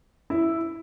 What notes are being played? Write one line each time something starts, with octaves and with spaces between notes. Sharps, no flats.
E4